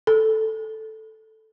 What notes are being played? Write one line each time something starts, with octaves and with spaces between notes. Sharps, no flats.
A4